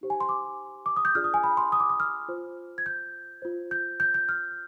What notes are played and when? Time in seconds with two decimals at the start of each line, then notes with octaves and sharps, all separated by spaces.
0.01 D#4 G4 C5
0.10 G#5
0.21 C6
0.29 D6
0.86 D6
0.96 D#6
1.05 G6
1.15 D4 F4 G#4 D5 F6
1.24 D#6
1.34 G#5
1.44 B5
1.57 C6
1.72 D#6
1.80 D6
1.90 D#6
2.00 F6
2.28 F4 C5
2.78 G#6
2.86 G6
3.42 F4 C5
3.71 G6
4.00 G6
4.14 G6
4.29 F6